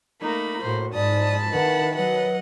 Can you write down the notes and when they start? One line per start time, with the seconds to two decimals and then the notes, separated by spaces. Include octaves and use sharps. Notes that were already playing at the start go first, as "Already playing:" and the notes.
0.22 A3 A#3 D#4 B5
0.62 A2 F#4 C5
0.95 G#2 D5 A5 B5 D#6
1.53 D#3 E4 B4 F#5
1.95 F#3 B4 D#5 F#5